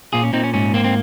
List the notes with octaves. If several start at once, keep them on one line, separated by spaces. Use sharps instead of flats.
A#2 F4 G#4
C#4
A#2 C4 D#4
C#4
G#2 C#4
A#3 C4
C4